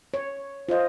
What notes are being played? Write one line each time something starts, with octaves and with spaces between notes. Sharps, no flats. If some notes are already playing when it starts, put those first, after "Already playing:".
C#5
F4 C5 D#5